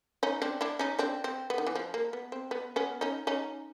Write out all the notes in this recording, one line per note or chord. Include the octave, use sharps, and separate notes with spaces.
C#4 D#4
C4 D4
D4 E4
C#4 D#4
C4 D4
C4
B3
D#3
E3
F3
A#3
B3
C4
B3
B3 C#4
C#4 D#4
C#4 D#4